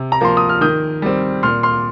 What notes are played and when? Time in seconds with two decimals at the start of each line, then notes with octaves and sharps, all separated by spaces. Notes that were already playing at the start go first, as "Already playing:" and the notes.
Already playing: C3
0.12 A#5
0.21 F3 A#3 C6
0.37 D#6
0.49 F6
0.61 D#3 D#6 G6
1.02 G3 C4
1.43 A#2 C6 F6
1.63 C6 F6